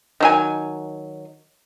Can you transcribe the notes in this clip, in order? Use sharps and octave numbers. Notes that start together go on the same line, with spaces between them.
D#3 F#3 G#5